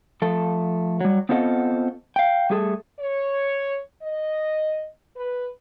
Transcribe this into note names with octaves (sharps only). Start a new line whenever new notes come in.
F3 A3 A4
F#3 G3
B3 C4 F4 A4 D#5 F#5
F5 G5
G3 A3 G#4 A4
C#5
D#5
B4